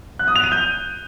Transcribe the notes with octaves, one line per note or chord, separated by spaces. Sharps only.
F#6
D#6
F7
D#7
G6